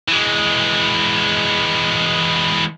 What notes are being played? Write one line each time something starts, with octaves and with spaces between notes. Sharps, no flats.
E3 G#3